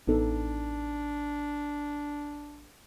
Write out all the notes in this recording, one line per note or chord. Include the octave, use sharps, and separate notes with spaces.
A1 B3 D4 D#4 A4